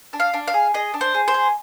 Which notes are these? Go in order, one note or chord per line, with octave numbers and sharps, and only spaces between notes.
D4
F5
D4
F5
G#4
G#4 D#5
D4
C5
G#4
C5
G#4